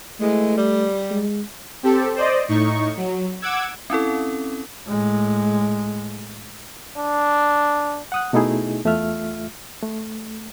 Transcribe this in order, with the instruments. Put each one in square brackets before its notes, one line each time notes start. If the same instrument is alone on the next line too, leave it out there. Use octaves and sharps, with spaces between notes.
[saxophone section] E3 G#3 [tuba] A3
[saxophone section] G3
[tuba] G#3
[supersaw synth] C4 G4 A4
C5 D5 D#5
A2 D#4 C#6
F#3
F#5 D6 E6 G#6
[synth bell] C4 C#4 E4 A4
[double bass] A2 G#3
[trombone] D4
[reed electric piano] F#5 D#6 F#6
B2 A3 D#4 E4 G#4
E2 A3 F4 E5 F6
A3